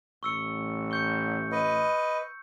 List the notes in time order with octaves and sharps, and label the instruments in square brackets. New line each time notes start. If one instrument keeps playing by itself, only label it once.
[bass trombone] A1 [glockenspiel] C#6 E6 C#7
[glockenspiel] C#6 G6 C#7
[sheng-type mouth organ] B4 D#5